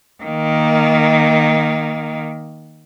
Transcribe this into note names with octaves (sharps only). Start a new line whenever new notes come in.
D#3 A#3